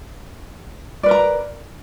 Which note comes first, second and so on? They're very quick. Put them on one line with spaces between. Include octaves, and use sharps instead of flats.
D5 B4 A#4 A#5